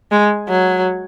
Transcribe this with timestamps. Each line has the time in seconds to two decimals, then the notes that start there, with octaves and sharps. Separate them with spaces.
0.11 G#3
0.49 F#3